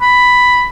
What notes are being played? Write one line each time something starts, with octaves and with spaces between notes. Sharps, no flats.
B5